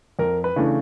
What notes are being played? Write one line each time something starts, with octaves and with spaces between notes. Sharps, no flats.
F2 A#4
B4
C#3 E3 A3 D4